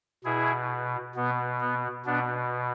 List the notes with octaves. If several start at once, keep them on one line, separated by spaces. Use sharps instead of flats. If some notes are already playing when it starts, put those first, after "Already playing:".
B2 E4 G#4
B2 B3
B3
B2 B3 D4